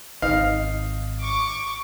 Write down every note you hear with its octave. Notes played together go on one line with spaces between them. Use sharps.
G#1 D#4 F5
C#6 D6